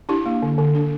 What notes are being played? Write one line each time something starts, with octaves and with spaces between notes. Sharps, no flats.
D4 E4 G4
A#3
D3
D3
D4